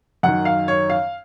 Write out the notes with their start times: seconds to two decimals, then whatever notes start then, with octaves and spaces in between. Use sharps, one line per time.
0.23 F#2 D#3 F#5
0.45 F5
0.68 C#5
0.90 F5